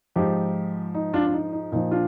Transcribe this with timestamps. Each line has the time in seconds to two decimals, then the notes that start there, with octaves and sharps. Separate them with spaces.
0.16 G#2 F3 D#4 G4
0.94 D#4
1.14 D4 F4
1.27 D4
1.33 D#4
1.53 D#4
1.72 A#2 F3 D#4
1.91 D4 F4